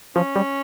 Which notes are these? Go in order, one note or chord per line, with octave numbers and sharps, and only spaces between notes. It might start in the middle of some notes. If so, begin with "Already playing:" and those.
F3 C#4
G3